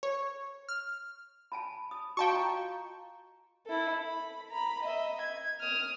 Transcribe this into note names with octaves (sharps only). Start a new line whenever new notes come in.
C#5
F6
G#5 A5 B5
D#6
F#4 D#5 F5 G5 A5 C#6
F4 A#5
E4 A4
B5
A#5 B5
D#5 E5
G#6
D#6 F6